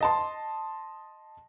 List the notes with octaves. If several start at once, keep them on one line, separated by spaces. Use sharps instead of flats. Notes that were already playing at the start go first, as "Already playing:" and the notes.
D#5 A5 C6